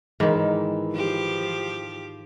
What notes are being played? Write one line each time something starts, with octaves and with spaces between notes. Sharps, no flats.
G#2 D#3 E3
F3 G4